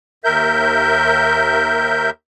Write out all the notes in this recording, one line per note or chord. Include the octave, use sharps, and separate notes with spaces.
D#2 A#4 E5 G6